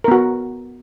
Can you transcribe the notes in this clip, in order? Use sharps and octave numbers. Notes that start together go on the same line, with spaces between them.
B3 F#4 A#4